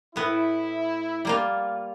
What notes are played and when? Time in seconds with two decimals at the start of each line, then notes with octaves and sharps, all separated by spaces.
0.16 A2 B3 E4
1.25 G3 A#3 F4